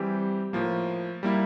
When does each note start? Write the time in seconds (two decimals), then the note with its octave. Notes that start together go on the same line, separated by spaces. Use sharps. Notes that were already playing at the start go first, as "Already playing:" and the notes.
Already playing: E3 G3 C4 G4
0.53 A2 F3 A#3
1.23 G3 A#3 E4